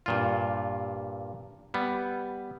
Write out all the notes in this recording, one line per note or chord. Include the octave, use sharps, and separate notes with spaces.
G2 A#2 F4
G3 B3